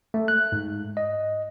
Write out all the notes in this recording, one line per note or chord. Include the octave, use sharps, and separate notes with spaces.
A3
F#6
G#2
D#5